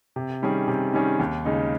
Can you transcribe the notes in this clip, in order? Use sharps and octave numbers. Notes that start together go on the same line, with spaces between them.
C3
D#3 G3 C#4 G#4
C3
D#3 G3 C#4 G#4
D#2
C#3 G#3 D#4